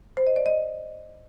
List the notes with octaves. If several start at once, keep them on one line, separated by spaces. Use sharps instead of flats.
C5
D#5
D5
D#5